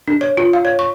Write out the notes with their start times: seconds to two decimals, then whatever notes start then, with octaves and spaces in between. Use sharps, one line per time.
0.08 D4
0.21 C#5
0.37 F4
0.53 F5
0.65 C#5
0.79 C#6